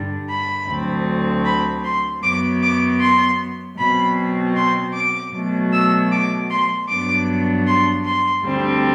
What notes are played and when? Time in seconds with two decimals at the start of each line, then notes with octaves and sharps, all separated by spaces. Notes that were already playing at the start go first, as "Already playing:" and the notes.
Already playing: G2 D3 G3 D4
0.29 B5
0.68 D2 D3 F#3 C4
1.45 B5
1.85 C6
2.23 F#2 F#3 B3 D6
2.63 D6
3.01 C6
3.79 B2 F#3 C4 B5
4.57 C6
4.95 D6
5.34 B2 F#3 A3
5.73 E6
6.12 D6
6.51 C6
6.89 G2 F#3 B3 D4 D6
7.67 C6
8.06 C6
8.45 D2 D3 G3 C4